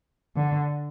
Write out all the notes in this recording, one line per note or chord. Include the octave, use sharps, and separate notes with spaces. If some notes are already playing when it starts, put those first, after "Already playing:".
D3